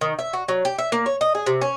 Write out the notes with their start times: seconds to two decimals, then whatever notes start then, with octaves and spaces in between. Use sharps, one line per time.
0.01 D#3
0.19 E5
0.33 F#4
0.48 F#3
0.65 G4
0.78 E5
0.92 A#3
1.06 C#5
1.21 D#5
1.35 G#4
1.46 C3
1.62 C#4